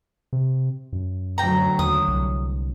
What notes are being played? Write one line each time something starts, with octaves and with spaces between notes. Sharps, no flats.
C3
F#2
D2 F#3 G5 A#5
D#2 D#6
C2